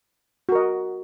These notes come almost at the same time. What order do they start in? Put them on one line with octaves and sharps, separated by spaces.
F#4 A#4 D#5